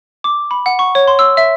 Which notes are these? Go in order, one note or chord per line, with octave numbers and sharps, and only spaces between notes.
D6
B5
F#5
C#6
C#5
C6
E6
E5